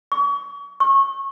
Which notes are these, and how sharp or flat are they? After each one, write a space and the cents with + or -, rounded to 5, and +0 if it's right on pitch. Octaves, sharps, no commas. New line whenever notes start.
C#6 +40
C#6 -25